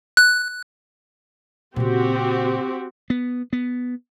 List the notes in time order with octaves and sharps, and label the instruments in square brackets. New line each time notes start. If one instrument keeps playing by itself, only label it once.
[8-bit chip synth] F#6
[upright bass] A#2 C#3 [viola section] C4 F#4 G4
[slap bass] B3
B3